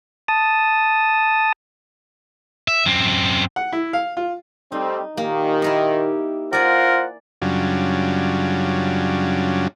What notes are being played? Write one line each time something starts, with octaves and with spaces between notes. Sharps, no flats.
A5 D#6
E5
F#2 C4
F#5
E4
F5
F4
G3 A3 C4 D#4
A#2 D#3 A#3 D#4 G4
E4 A#4 D#5
F4 A#4 C5 D5 F#5 G#5
F#2 C#3 F#3 G3 D4 F4